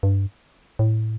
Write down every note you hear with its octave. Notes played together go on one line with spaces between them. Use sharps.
G2
A2